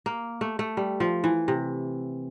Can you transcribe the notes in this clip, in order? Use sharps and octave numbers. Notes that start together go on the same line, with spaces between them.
A#3
A3
A3
G3
F3
E3
C3